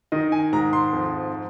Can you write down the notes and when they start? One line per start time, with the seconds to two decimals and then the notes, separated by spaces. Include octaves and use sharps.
0.12 D#3 D#5
0.32 G#5
0.52 G#2 A#5
0.73 C6
0.93 F2